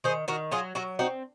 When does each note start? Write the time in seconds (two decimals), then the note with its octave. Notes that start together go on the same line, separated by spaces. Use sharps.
0.04 D#3 G#4 C5
0.28 D#3 F#4 A#4
0.51 F#3 F4 G#4
0.75 F#3 F#4 A#4
0.99 C4 D#4 F#4